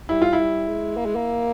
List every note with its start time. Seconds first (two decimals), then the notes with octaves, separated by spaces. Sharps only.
0.09 G3 E4
0.22 F4
0.33 E4
0.38 G3
0.67 G#3
0.97 A#3
1.06 G#3
1.15 A#3